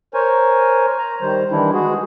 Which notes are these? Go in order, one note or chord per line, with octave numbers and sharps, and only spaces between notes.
A#4 C5 C#5 G#5
A#5
D#3 G3 C5
D#3 E3 G3 D4 E4
G#3 F#4 G#4